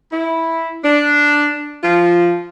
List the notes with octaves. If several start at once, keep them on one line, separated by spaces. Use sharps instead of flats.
E4
D4
F3 F4